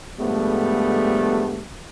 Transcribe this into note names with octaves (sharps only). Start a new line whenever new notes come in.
G#2 D3 F3 G3 A3 B3